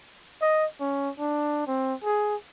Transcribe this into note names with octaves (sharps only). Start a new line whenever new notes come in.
D#5
C#4
D4
C4
G#4